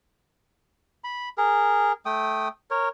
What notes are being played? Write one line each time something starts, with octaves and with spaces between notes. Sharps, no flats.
B5
G#4 A#4
A3 G5 D#6
A#4 C#5